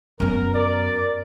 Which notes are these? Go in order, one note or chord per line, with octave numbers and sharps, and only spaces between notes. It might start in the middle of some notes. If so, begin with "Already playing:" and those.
F#2 B3 A#4
A#4 D5